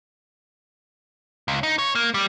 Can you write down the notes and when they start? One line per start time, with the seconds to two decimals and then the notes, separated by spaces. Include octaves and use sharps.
1.48 C#2
1.63 D#4
1.79 C#5
1.95 A#3
2.14 G3